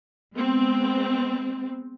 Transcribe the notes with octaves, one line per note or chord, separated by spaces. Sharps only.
G#3 B3 C4